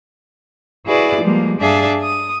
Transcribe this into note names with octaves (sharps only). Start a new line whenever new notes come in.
E4 F#4 G#4 B4 D5
F3 G3 G#3 A#3
G2 D4 G#4 D5 E5 F5
D#6